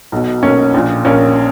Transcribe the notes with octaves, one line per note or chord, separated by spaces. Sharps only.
B1 B2
B1 B2 A#3 C#4
A#1 A#2
A#1 A#2 A#3 C#4